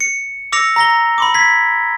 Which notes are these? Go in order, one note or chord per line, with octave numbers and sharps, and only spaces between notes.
C#7
D6 E6 A#6 C#7 F7
A#5 A#6 G7
B5 C6 D6
G#6 B6